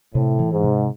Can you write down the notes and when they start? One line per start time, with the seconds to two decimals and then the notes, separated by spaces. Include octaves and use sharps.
0.14 A2 C3
0.39 E3
0.52 G#2
0.64 C3